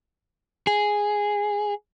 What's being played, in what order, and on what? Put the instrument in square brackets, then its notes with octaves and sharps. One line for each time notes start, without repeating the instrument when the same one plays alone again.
[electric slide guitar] G#4